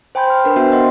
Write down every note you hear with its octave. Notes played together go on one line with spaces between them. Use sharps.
C5 G5 G#5 B5 C6 G6
F6
D4 A#4 B4
B3 F#4 C5 E5 G5
D#5 F#5 C6